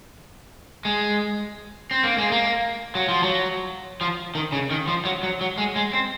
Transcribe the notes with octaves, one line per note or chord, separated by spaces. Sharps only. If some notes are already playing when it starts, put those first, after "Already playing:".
G#3
C4
A#3
G#3
A#3
F#3
F3
F#3
F3
D#3
C#3
D#3
F3
F#3
F#3
F#3
G#3
G#3
C4